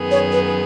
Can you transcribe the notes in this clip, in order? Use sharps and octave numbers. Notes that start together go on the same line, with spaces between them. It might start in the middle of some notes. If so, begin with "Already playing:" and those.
Already playing: F#2 D#3 B3 G#4
C#5
B4